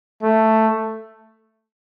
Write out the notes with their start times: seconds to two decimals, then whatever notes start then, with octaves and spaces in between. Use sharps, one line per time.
0.23 A3